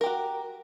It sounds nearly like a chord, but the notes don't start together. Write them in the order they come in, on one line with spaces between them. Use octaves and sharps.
A#4 G4 F#4